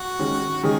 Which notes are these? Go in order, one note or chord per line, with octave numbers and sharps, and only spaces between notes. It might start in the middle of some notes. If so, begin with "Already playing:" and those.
Already playing: F#4 F#5
D#3 G#3 C#4
D#3 G#3 C#4 G#4